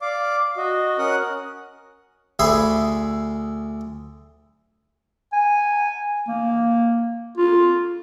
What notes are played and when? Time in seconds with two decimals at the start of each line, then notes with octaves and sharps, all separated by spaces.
0.02 D5 F5 D6
0.57 F#4 D#5
0.98 C#4 A#4 F#5 D#6 F#6
2.39 D2 G#4 E5 B5 C6
5.33 G#5
6.28 A#3
7.37 F4